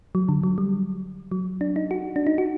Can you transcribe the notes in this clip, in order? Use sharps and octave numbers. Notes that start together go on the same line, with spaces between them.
F#3
D3
F#3
G3
F#3
D4
D#4
F#4
D4
D#4
F#4